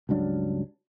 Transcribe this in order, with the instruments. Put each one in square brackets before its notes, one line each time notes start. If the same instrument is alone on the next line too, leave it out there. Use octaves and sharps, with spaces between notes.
[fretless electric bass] C#2 G2 F#3 D4